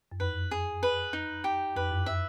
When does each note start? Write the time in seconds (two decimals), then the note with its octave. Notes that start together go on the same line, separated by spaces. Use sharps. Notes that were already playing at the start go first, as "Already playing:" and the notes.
0.12 F#2
0.20 F2 B4
0.51 G#4
0.83 B4
1.13 D#4
1.44 G4
1.76 F2 B4
1.91 F#2
2.06 E5